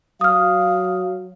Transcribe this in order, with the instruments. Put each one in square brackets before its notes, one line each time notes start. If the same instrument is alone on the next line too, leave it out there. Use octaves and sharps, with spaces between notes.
[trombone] F#3 [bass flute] F5 [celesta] D#6 F6